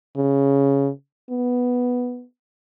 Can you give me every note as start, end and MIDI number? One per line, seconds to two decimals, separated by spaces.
0.16 0.89 49
1.30 2.24 59